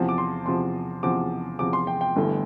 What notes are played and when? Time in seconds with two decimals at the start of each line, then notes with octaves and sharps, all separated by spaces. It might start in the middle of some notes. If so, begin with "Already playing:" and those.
Already playing: E2 C3 F3 A5
0.09 D6
0.18 C6
0.46 E2 C3 F3 C6
1.03 E2 C3 F3 D6
1.59 E2 C3 F3 D6
1.73 C6
1.87 G5
2.01 G5
2.16 G1 G2 E3 A3